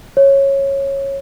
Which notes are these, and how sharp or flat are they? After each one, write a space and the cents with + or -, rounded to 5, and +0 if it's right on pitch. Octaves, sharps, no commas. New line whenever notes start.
C#5 -15